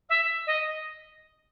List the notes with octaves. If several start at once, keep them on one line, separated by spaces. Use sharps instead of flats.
E5
D#5